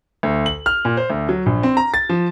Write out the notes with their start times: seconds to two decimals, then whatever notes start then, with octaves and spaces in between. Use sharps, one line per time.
0.23 D2
0.46 F#7
0.66 F6
0.85 A#2
0.97 C5
1.10 D2
1.29 F#3
1.46 A#1
1.63 C4
1.77 A#5
1.94 A6
2.09 F3